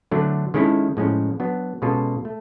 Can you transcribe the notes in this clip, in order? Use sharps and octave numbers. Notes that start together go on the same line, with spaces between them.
D3 F#3 A3 D4
D#3 G#3 C#4 E4 A4
A2 F3 G#3 C#4
F#3 B3 D4
B2 G#3 C#4 F4 A4
A3